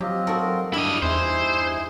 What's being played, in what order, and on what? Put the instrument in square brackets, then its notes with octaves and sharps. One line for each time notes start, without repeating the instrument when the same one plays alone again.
[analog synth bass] F#3 [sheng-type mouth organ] C4 F4 D#5 [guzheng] G4
[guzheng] F#4 A4 A#4
[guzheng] G2 [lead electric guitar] E4 D#5 [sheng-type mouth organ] D6 E6 F6
[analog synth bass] E2 [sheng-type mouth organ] D#4 E4 G#4 [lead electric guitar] C5